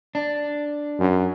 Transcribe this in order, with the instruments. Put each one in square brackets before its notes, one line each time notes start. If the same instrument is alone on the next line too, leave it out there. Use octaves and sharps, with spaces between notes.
[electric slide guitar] D4
[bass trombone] F#2